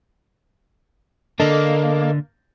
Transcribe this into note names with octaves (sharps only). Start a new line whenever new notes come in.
D3 A#3 D4 A4 D#5